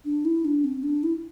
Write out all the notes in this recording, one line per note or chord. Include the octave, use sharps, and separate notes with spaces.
D4
E4
D4
C4
D4
E4